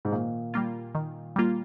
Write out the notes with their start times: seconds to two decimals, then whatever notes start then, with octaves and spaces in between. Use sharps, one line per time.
0.05 G#2
0.12 A#2 D#3
0.54 G3 A#3 F4
0.95 D#3
1.36 G3 A#3 F4